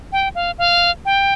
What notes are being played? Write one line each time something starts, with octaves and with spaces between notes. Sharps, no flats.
G5
F5
F5
G5